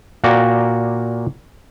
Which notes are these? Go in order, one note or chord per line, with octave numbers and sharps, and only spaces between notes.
A#2 A#3 F#4 D5 G5 A#5